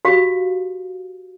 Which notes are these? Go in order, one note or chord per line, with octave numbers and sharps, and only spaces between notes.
F#4 G4 F5